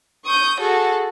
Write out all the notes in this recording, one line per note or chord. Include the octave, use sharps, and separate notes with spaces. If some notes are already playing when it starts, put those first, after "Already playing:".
C#6 D#6 G6
F#4 G#4 A4